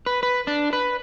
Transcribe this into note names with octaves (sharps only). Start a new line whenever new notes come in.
B4
B4
D4
B4